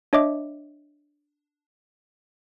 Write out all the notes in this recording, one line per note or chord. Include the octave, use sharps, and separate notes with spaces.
D4 C#5 D#5 E5 D6